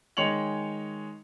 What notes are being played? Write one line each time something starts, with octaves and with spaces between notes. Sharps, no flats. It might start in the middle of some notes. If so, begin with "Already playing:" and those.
D#3 G#3 C#5 C#7 F7 F#7